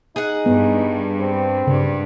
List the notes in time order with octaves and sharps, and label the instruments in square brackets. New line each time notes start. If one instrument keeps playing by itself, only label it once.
[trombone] D#4 [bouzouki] G#4 F#5
[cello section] G2 [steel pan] B3
[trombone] C4
[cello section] G2 [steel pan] C#3